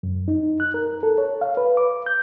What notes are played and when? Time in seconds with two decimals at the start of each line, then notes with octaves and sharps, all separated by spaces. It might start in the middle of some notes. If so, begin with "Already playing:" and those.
0.03 F#2
0.28 D#4
0.60 F#6
0.74 A#4
1.03 A4
1.18 C#5
1.41 F5
1.57 B4
1.77 D6
2.06 G6